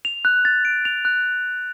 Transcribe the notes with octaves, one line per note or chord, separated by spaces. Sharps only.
F7
F#6
A6
D7
F7
F#6